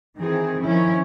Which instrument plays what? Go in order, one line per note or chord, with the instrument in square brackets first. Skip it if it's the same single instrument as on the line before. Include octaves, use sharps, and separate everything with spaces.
[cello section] D#3 E3 C4 G#4
D#3 F3 C#4 E4